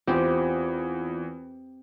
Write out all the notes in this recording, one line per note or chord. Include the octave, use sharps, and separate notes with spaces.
E2 C4 F4 G4